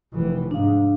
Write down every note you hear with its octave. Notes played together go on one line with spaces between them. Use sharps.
F1 E3
G#2 D4 F5